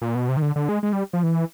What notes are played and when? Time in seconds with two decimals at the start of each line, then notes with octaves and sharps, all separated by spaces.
0.02 A#2
0.15 B2
0.29 C3
0.37 D#3
0.42 D3
0.56 D3
0.69 G#3
0.83 G#3
0.93 G3
1.13 F3
1.23 E3